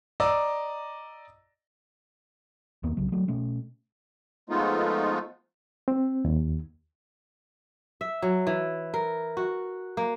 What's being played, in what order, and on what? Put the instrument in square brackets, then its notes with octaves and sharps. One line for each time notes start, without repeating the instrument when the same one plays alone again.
[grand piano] D5 D#5 A#5 D6 E6
[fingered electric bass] D#2 A#3 B3
B1 C#3 F#3
F#3 A3
B2 A3 C#4
[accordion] F3 G#3 A3 B3 D#4 F4
[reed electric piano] C4
D#2
[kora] E5
F#3
E3
A#4
F#4
A#3